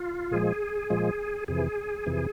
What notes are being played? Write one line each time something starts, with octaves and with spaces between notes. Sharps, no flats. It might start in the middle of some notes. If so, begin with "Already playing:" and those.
Already playing: F4
A#2 F3 G#3 G#4
A#2 F3 G#3
F2 C3 E3 G#4
F2 C3 E3